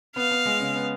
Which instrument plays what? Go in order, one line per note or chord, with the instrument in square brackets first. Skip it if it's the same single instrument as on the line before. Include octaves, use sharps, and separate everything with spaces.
[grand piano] B3 [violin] F5
[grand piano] B3
G#3
C#3
B3